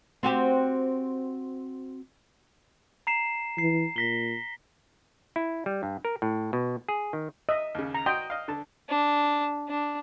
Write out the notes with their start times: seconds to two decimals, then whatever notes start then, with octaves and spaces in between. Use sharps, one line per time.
0.23 C4 F#4 G4
3.07 A#5 C7 E7
3.58 E3 C7
3.96 A#2 A#6 B6 G7
5.36 E4
5.66 G3
5.83 G2
6.05 A#4
6.22 A2
6.53 B2
6.89 G#4
7.13 D#3
7.49 D#5 E5 E6
7.75 D#2 C#3
7.94 A#5
8.06 F#4 D#5 G5 C6
8.30 D#5 F5
8.48 D3 A5
8.89 D4
9.69 D4